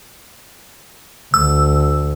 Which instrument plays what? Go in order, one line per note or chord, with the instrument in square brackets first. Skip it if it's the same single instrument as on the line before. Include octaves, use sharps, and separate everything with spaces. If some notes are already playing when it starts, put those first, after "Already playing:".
[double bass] D2 [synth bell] E6